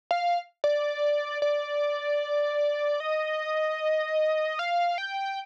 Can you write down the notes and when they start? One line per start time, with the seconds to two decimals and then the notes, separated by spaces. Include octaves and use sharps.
0.11 F5
0.64 D5
1.42 D5
3.00 D#5
4.59 F5
4.98 G5